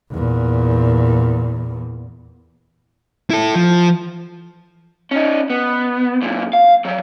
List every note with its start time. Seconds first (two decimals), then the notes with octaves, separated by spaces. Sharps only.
0.11 E2 A#2
3.31 E4 A4
3.55 F3
5.11 C#4 D#4
5.50 B3
6.22 F#2 A#2
6.53 F5
6.85 F#3 G3